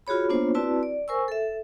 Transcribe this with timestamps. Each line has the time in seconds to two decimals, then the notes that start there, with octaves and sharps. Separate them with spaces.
0.07 F4 F#4 G#4 C#5 B5
0.29 A#3 B3 D4 F4 C5 C#5
0.55 C4 E4 F#4 B4 D5 A5
0.83 D5
1.08 A#4 C5 G#5 C#6 E6
1.28 A4 E5